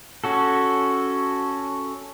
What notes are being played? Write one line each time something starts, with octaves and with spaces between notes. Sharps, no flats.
C#4 F#4 A4